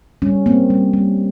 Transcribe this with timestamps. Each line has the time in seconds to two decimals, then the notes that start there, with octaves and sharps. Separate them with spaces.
0.22 G3 C#4
0.46 A#3 C4
0.70 G3
0.93 G3